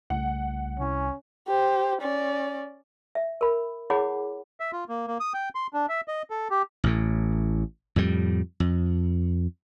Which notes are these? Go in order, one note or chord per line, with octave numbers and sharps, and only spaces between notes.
C2 C#3 A3 F#5
C3 C#4 E4 G#5
G4 C5
C#4 D5
E5
A#4 B5
E4 G#4 C#5 F#5 B5 D6
E5
F4
A#3
A#3
D#6
G5
C6
D4
E5
D#5
A4
G4
A1 A2
F2 A2 G3
F2